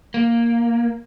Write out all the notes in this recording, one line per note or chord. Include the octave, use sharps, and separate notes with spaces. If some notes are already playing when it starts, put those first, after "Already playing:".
A#3